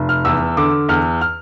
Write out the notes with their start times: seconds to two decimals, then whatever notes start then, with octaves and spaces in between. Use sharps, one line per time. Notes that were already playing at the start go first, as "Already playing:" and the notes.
Already playing: F1
0.09 F6
0.25 E2 E6
0.57 D3 D6
0.89 E2 F6
1.21 F6